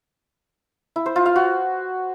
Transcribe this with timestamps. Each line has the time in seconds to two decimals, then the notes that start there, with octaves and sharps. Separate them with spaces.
0.96 E4
1.06 C5
1.16 F4
1.26 F5
1.36 F#4